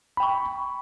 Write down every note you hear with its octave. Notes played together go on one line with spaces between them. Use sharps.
G5 B5 C#6